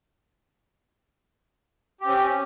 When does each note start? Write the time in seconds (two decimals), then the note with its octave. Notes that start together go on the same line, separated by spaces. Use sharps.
2.01 G4
2.04 C4
2.07 C#4